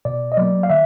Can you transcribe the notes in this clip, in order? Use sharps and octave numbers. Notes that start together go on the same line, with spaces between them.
B2 D5
D#5
F#3 A#3 D5
F5
D#3 E5